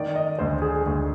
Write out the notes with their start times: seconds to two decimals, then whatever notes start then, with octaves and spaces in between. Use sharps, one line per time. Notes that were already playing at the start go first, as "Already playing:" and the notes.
Already playing: D#3 D5
0.15 D#5
0.39 D2 C5
0.62 G#4
0.86 D2